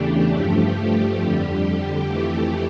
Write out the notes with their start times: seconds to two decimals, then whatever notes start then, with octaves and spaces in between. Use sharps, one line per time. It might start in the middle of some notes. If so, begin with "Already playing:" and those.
Already playing: E2 C#3 E3 A3 D4 G4
0.31 G2 F3 A3 G4
1.17 F2 D3 G3 G4
2.04 F2 E3 A3